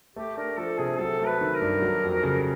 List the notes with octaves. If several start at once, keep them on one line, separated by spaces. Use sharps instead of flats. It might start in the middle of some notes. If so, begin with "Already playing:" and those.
A3 G4
D4 A#4
F3 A4
C3 G#4
F#3 A4
A3
B4
D#3
A#4
G2
F#3
F2
C#3